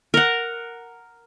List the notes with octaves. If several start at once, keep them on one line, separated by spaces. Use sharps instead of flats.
A#4 F#5